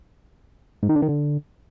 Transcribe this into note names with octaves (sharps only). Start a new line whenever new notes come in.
G#2
D#3
D3
D#3
D3